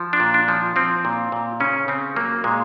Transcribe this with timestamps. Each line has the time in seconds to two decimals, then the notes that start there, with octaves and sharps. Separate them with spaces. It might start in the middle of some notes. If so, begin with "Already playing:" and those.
Already playing: F3
0.13 D4
0.20 A#2
0.34 D4
0.48 F3
0.76 F3 C4
1.05 A#2
1.32 A#2
1.60 C#3 C#4
1.88 C#3 C4
2.16 F#3 A#3
2.44 A#2 G#3